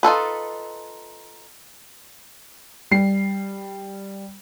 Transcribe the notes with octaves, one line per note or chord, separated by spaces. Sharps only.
D#4 F4 A4 B4
G3 C7